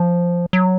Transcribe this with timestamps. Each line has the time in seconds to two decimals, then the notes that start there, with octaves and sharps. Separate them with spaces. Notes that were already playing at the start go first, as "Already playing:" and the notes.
Already playing: F3
0.53 F#3